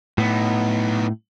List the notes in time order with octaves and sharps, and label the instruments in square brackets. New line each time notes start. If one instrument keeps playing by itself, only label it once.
[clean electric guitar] A2 [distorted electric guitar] B3 D#4